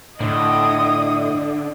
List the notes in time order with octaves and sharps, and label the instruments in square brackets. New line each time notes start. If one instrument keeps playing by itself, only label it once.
[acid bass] A2 [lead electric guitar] D3 [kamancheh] D#5 D#6